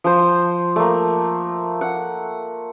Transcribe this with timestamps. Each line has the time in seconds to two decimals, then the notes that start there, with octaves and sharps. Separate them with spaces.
0.04 F3 C5
0.76 A3 A#3
1.81 F#5